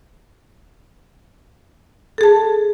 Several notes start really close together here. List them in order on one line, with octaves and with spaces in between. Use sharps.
A4 G#4 A5